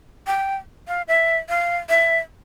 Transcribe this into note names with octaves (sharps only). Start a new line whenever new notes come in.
G5
F5
E5
F5
E5